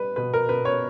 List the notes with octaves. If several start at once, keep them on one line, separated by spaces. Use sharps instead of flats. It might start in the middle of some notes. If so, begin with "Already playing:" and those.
Already playing: G3 B4
B2 B4
A#4
B2 B4
C#5